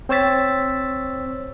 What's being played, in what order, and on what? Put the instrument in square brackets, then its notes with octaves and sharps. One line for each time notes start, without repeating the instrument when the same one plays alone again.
[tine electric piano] C4 C5 C#5 E6 A6 B6